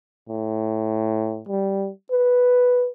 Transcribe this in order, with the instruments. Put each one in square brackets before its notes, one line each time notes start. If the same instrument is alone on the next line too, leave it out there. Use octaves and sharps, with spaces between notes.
[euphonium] A2
G3
B4